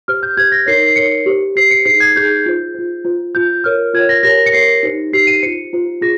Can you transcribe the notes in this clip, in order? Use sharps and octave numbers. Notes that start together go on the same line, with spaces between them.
G4 C5 F6
G6
G4 C5 G#6
A#6
D#4 A#4 C#5 C7
C7
D#4 A#4 C#5 C#7
G4 C5
G4 C5 C7
C#7
D#4 G#4 C5 C7
G#6
D#4 G#4 C5 G6
F4 C5
F4 C5
F4 C5
F4 C5 G6
F4 A#4 C#5 F6
F4 A#4 C#5 G#6
A#6
G4 A#4 C#5 A#6
C#7
G4 A#4 C#5 C7
D#4 G4 C5
D#4 G4 C5 C7
D#7
F4 C5 C#7
F4 C5
F4 G#4 A#6